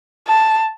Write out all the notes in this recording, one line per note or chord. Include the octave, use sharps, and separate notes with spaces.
A5